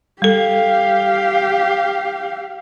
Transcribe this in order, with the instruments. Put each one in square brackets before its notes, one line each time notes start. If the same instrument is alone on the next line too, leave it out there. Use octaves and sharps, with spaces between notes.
[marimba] G3 A4 [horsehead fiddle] G4 F5